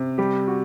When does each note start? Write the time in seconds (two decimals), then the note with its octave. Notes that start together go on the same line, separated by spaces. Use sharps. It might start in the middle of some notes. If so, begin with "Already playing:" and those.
Already playing: C3
0.18 G3 G4
0.48 F#4